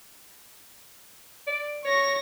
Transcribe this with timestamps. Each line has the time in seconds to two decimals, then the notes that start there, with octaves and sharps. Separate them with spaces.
1.47 D5
1.85 C#5 C#6 A#6